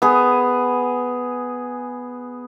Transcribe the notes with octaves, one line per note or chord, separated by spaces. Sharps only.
B3 G#4